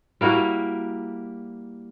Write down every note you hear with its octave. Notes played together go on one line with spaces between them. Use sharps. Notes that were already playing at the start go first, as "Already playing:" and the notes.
G3 A#3 E4 F#4